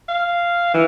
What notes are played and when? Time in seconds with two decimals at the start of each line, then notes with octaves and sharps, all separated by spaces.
0.08 F5
0.74 E3